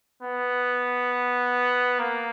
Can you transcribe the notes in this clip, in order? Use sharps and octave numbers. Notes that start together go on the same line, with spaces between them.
B3
A#3